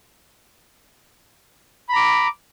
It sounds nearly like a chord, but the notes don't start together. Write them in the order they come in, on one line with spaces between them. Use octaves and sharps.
B5 A#5 D6